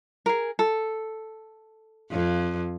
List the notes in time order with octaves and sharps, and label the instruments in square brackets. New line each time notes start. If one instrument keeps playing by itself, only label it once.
[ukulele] G#4 A#4
A4
[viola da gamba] F2